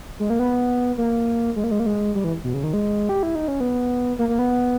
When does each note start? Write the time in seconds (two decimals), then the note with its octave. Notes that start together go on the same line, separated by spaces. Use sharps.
0.20 G#3
0.30 A#3
0.39 B3
0.98 A#3
1.56 G#3
1.64 A#3
1.71 G#3
1.80 A#3
1.86 G#3
2.15 G3
2.24 E3
2.44 B2
2.54 C#3
2.64 D#3
2.73 G#3
3.09 G4
3.23 E4
3.35 D#4
3.48 C#4
3.60 B3
4.19 A#3
4.29 A#3
4.39 B3